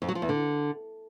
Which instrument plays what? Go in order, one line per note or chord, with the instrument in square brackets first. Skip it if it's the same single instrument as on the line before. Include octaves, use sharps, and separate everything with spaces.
[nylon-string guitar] F2
F#3
F3
E2
D3